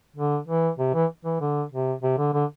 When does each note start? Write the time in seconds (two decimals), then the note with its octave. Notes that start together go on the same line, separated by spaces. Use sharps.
0.16 D3
0.48 E3
0.79 C3
0.94 E3
1.25 E3
1.41 D3
1.72 C3
2.03 C3
2.18 D3
2.34 D3